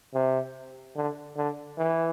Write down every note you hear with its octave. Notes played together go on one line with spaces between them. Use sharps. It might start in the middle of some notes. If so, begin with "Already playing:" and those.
C3
D3
D3
E3